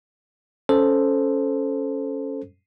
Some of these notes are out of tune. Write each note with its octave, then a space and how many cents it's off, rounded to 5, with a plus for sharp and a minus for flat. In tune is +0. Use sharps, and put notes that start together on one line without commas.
C#4 +0 A4 +0 C5 +0